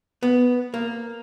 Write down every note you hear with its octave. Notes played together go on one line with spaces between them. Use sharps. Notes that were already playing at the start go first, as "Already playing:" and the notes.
B3
A#3